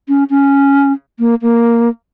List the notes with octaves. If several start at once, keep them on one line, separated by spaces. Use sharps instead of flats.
C#4
C#4
A#3
A#3